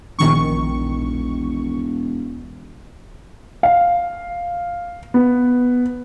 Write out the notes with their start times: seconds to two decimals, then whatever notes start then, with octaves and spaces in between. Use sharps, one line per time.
0.19 E1 A#1 D#3 C#6
3.63 F5
5.14 B3